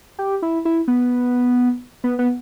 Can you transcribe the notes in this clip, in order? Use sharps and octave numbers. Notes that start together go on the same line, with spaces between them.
G4
E4
E4
B3
B3
B3